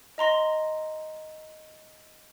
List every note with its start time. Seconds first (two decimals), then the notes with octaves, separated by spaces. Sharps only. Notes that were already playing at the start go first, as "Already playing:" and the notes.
0.18 D#5 A#5 C6 A#6